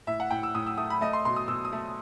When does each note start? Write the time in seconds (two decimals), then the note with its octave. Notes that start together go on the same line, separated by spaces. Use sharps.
0.07 A2 E5
0.20 F#5
0.31 A2 G5
0.43 E6
0.55 A2 D#6
0.67 E6
0.77 A3 D#6
0.90 B5
1.01 A3 D#5
1.13 C6
1.25 B2 C6
1.36 D#6
1.48 B2 E6
1.65 D#6
1.73 A3